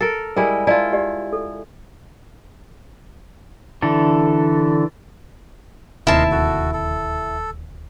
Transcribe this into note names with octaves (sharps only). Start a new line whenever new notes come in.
A4 A#4
G3 G#3 E4 A#4
E4 F4 D5 A5
G4 D5
A4
D3 E3 A4
D1 D#2 C3 E4 A#4 D#5 A5 C6
F#4 A4
A4